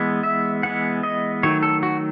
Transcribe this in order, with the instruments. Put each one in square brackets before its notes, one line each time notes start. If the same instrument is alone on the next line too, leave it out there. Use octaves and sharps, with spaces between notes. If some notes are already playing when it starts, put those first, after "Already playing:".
Already playing: [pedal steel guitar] E3 G#3 B3
E5
E3 G#3 B3 F#5
D#5
D#3 F#3 A3 C#5
A4
F#4